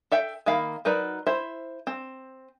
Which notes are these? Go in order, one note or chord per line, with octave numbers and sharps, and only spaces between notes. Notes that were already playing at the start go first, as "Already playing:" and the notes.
A4 E5 G5
D#3 A#3 E5 F5 B5
F#3 D#4 A#4 B4 D5
E4 C5 E5
C4